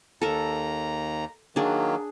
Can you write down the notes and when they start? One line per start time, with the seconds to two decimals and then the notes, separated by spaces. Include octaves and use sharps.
0.22 D#2 A4 A#4 A#5
1.56 D#3 F#3 A#3 D4 G#4